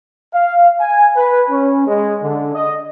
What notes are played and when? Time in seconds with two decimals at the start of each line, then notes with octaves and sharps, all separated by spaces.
0.32 F5
0.79 G#5
1.15 B4
1.49 C#4
1.86 G#3
2.21 D3
2.53 D#5